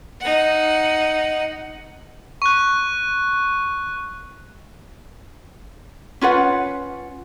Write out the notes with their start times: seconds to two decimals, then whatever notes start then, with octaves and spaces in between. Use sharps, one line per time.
0.21 D#4 F#5
2.42 C#6 F#6
6.21 C#4 F4 B4 F#5